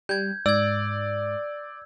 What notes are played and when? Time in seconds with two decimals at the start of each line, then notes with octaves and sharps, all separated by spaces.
0.09 G3 G6 G#6
0.46 G#2 D5 E6 G#6